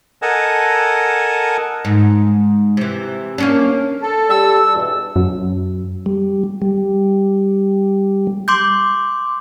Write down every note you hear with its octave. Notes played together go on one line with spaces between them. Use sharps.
A4 A#4 D#5 F#5 G#5 A5
G#2
C3 E3
A#3 C#4 D4
A4
G3 E6
E2 G2 B2
F#2
G3
G3
C6 D6 G6